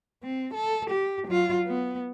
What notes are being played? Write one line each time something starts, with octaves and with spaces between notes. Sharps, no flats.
C4
A4
G4
F#3 F4
B3